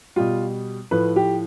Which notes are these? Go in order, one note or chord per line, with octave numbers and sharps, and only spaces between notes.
B2 G3 F4
A2 F3 B4
G4